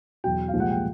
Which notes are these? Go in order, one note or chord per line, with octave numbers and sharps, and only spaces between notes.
E2 B2 F#3 G5
F5
C2 A#2 F3 G#3
F#5
G5